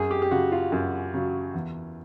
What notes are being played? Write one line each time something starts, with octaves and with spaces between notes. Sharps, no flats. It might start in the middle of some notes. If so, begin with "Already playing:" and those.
Already playing: F#2 G#4
G4
G4
C#3 F#3 F#4
F4
F#2
C#3 F#3
E2